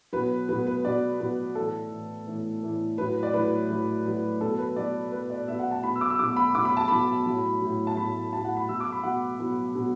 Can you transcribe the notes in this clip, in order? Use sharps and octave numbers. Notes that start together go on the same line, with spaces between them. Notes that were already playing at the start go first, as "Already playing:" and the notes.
B2 F#3 B4
B2 F#3 B4
B4
B2 F#3 D5
B2 F#3 B4
A2 E3 A4
A2 E3
A2 E3
A2 E3
A2 F#3 B4
D5
A2 F#3 B4
A2 F#3
A2 F#3
B2 F#3 A4
B4
B2 F#3 D5
B2 F#3 B4
D5
B2 F#3 E5
F#5
A5
B2 F#3 B5
E6
D6
E6
B2 F#3 D6
B5
B2 F#3 D6
B5
A5
B2 F#3 B5
A2 F#3
A2 F#3
A5
A2 F#3 B5
A2 F#3 A5
F#5
B5
B2 F#3 E6
D6
B5
B2 F#3 F#5
B2 F#3
B2 F#3